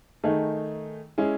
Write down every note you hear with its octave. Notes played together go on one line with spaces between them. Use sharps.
D#3 A3 D#4 G#4
G#3 C#4 E4 G#4